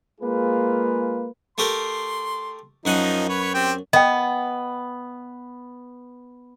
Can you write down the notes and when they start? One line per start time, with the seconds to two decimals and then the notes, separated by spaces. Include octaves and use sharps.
0.21 G#3 A#3 F4 G#4 B4
1.58 A3 G4 A#4 C6
2.85 F#2 F3 D#4 F#5 G#5
3.29 B4 C#5 B5
3.54 C4 G4 G5
3.93 B3 D#5 G5